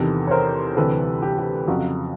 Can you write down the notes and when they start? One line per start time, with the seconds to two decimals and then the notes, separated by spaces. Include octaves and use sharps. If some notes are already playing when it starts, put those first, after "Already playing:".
Already playing: E2 C3 D#3 A4 B4
0.27 C#5
0.31 A#4 C5
0.76 D2 C3 E3 G3 A4 B4
1.22 G4
1.38 G4
1.68 F2 C#3 F#3 F#4